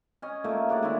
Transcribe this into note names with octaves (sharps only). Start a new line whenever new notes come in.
C#4 D#5 G#5
A#2 A3 A#3
C#3 D4 F#4 D5
D#3 G#3 D4 E4